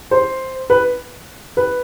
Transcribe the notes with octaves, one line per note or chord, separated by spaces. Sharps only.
C5
B4
B4